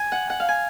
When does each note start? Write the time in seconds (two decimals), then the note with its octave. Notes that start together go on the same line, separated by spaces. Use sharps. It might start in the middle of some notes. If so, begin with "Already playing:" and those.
Already playing: G#5
0.12 F#5
0.30 F#5
0.40 F5
0.49 G#5